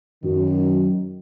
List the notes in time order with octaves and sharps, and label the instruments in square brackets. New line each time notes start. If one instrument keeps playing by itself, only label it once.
[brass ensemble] F#2 D#3